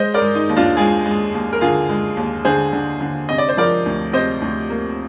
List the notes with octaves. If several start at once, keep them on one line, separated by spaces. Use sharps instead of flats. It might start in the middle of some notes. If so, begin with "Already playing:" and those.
Already playing: G#3 C5 D#5
A#4 D5
G#3
D#4
D#2
D4 F4
G#3 F4 G#4
G#3
D#2
A#4
D3 F4 G#4
G#3
D#2
D3 G#4 C5
D3
D3
C3 D#5
D5
C5
F3 A#4 D5
D2
C3 C5 D#5
D2
A#3